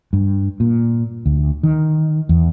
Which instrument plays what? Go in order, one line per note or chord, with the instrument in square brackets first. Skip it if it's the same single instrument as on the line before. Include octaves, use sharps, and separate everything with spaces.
[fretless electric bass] G2
A#2
D2
D#3
E2